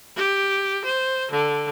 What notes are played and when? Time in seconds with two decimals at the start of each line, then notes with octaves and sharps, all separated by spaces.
0.15 G4
0.84 C5
1.31 D3